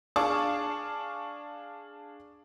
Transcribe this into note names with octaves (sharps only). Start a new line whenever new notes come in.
D4 G#4 F5 A5 C#6 D6